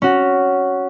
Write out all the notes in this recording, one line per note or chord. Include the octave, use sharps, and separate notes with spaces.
C#4 F#4